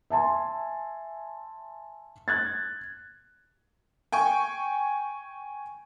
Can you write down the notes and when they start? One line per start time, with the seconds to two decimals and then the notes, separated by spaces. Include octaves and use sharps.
0.10 E5 G#5 A5 C6
2.28 F#6 G#6 A6
4.12 G5 G#5 C#6